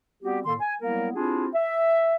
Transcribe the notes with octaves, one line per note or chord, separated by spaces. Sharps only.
G3 B3 C4 F#4 G4
A2 D#3 A#3 A4 C6
G#5
F#3 G3 A#3 B3 E4 A#4
C4 D4 E4 F4 G4 G#4
E5